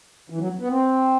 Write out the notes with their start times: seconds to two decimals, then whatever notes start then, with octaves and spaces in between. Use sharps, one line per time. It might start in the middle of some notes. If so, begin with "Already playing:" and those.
0.30 E3
0.39 F#3
0.60 B3
0.70 C4